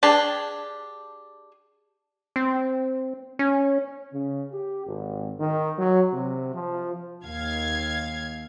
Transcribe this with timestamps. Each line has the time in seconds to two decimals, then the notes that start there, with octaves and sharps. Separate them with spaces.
0.03 D4 G4 G#4 A5
2.36 C4
3.39 C#4
4.12 C#3
4.52 G4
4.86 G#1
5.39 D#3
5.78 F#3
6.13 C3
6.53 F3
7.23 D#2 F5 G#6